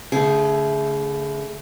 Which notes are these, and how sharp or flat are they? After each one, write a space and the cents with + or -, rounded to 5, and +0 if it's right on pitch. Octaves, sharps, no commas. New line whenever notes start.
D3 -45 A3 +0 G#4 +0